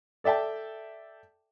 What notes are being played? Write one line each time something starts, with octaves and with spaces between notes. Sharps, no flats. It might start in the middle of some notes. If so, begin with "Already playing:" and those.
A4 D5 E5 G5 A5